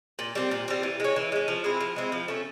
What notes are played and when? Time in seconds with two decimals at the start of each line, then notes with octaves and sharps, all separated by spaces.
0.19 A#2
0.35 G3 C4
0.51 A#2
0.68 G3 C4
0.83 E3
1.00 G#3 C#4
1.16 E3
1.32 G#3 C#4
1.48 F3
1.64 G#3 C4 E4
1.81 F3
1.96 G#3 C4 E4
2.12 F3
2.28 A3 C#4